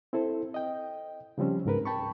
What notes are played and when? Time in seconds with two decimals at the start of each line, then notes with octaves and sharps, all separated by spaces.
0.13 C4 E4 A4 C5
0.54 D#5 G5
1.38 C#3 F3 G3 C4 C#4
1.65 C#2 G#2 A#4 B4
1.85 G5 A5 B5 C#6